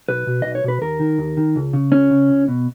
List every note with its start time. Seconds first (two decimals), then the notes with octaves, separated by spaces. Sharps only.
0.09 B1 B4
0.27 B2
0.42 B1 D#5
0.55 C#5
0.64 B2 B4
0.82 D#2 A#4
1.00 D#3
1.18 D#2
1.37 D#3
1.56 C#2
1.73 C#3
1.92 C#2 C#4
2.11 C#3
2.29 C#2
2.48 B2